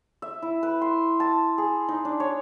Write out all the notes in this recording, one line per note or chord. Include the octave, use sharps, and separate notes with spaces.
E5
E4
B4
C6
A5
G#4
D#4
D4
C#5